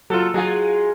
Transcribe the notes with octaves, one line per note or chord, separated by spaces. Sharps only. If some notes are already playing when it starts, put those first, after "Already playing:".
F#3 F4 A4
F#3 G#3 F4 G#4